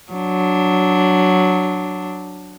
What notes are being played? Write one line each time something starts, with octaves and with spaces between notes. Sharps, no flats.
F#3 D4